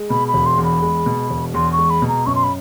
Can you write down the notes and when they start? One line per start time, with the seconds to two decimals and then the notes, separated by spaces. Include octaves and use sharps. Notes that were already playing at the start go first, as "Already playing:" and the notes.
Already playing: G#3
0.10 B2 B5
0.28 B5
0.34 E1
0.46 C6
0.58 E2
0.64 B5
0.82 G#3
1.06 B2
1.30 E1
1.54 E2 C6
1.72 C#6
1.78 G#3
1.90 B5
2.02 B2
2.08 A#5
2.26 F#2 C#6
2.35 C6
2.43 B5